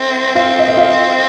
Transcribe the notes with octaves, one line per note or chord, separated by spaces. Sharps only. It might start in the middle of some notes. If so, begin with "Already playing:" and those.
Already playing: C4 E5
C4 F4 F5
D#5
E5
F4 F5